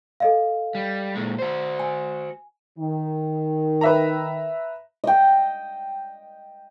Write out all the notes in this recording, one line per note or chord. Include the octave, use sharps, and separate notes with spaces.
A4 D#5 F5
G3
A#2 G#3
F#4 C5
G#5
D#3
B4 E5 A#5
D#5 G5